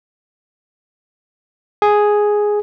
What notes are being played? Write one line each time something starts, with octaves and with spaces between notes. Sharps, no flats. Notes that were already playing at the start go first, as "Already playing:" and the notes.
G#4